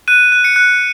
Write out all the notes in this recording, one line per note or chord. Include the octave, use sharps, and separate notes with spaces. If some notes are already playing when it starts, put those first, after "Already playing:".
F#6 D#7
F#6
C#7
F#6